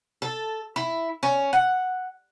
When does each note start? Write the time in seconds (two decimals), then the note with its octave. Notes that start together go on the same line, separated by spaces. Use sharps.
0.22 A4
0.76 E4
1.23 C#4
1.53 F#5